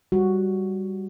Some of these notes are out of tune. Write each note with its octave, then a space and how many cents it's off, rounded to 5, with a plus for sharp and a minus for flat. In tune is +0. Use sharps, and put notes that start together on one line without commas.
G3 +0 F#4 +0